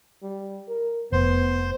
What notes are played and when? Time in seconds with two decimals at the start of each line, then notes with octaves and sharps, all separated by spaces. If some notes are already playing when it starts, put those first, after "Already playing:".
0.23 G3
0.68 A#4
1.12 F1 B3 C5